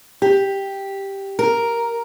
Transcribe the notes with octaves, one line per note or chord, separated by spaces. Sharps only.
G4
A#4